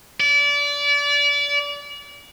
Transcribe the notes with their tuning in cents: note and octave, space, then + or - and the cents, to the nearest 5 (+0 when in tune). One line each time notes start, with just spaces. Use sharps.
D5 -30